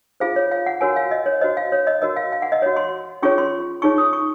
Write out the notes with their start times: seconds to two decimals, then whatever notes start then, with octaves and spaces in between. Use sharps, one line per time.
0.20 F4 G#4 C5 F5
0.36 C#5
0.52 F5
0.66 F#5
0.81 F#4 A#4 C#5 G#5
0.96 F5
1.11 D#5
1.26 C#5
1.41 F#4 C5 D#5
1.57 F5
1.72 C#5
1.87 D#5
2.02 F#4 A#4 C#5 D#5
2.16 F5
2.32 F5
2.42 F#5
2.52 D#5
2.62 F#4 C#5
2.77 C6
3.22 C#4 F4 G#4 C#5 C#6
3.38 C6
3.82 D#4 G#4 C#5 C#6
3.98 D#6
4.13 C#6